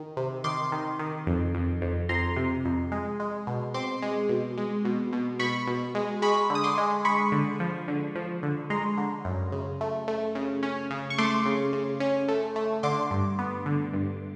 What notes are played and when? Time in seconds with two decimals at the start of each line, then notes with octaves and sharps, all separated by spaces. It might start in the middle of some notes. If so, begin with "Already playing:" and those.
Already playing: D#3
0.17 C3
0.44 D#3 C6 D6
0.72 D#3
0.99 D#3
1.27 F2
1.54 F2
1.81 F2
2.09 F2 A#5 C6
2.36 C3
2.65 F2
2.92 G#3
3.20 G#3
3.47 B2
3.74 C4 C6 D6
4.02 G#3
4.29 B2
4.58 G#3
4.85 B2
5.13 B2
5.39 B2 B5 C#6
5.67 B2
5.95 G#3
6.22 G#3 B5 C#6
6.50 D3
6.55 D#6
6.64 C6 D6
6.78 G#3
7.05 G#3 B5 C#6
7.32 D3
7.60 F3
7.88 D3
8.15 F3
8.43 D3
8.70 G#3 A#5 C6
8.98 D3
9.25 F#2
9.52 C#3
9.81 A3
10.08 A3
10.35 C#3
10.63 C#4
10.91 C#3
11.10 C#6
11.18 A3 C6 D6
11.46 C#3
11.73 C#3
12.00 C#4
12.28 A3
12.56 A3
12.83 D3 C6 D6
13.11 G2
13.39 B3
13.66 D3
13.93 G2